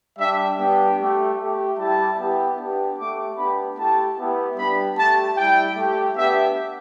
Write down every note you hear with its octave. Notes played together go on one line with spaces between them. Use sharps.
G3 D4 G4 E5
G3 B3 D4 G4 G5
A3 G4
A3 G4
G3 E4 G4 A5
B3 E4 G4
B3 D4 G4
A3 G4 D6
B3 D4 G4 B5
A3 E4 G4 A5
B3 E4 G4
G3 B3 D4 G4 B5
A3 G4 A5
G3 E4 G4 G5
A3 G4
B3 D4 G4 E5